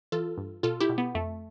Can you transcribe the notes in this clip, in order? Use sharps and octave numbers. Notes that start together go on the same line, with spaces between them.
E3 F4 A4
G2
B2 F4 A4
E4 G4
B2
B3
F2 A3